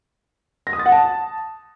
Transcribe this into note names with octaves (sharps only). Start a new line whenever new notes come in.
A#6
D#6
A6
F#5
A5